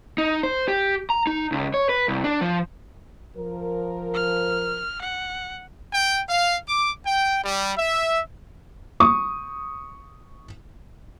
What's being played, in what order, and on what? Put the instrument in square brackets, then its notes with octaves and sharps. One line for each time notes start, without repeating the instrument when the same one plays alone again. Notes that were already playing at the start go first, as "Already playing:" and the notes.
[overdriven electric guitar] D#4
C5
G4
A#5
D#4
C#2
C#5
B4
C2
D4
F3
[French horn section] F3 A#4
[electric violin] F6
F#5
[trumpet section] G5
F5
D6
G5
G3
E5
[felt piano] C#6 D#6